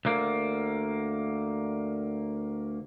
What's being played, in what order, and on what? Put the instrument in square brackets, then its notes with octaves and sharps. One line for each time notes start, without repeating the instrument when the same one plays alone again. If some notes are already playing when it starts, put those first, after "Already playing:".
[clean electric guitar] D2 A#3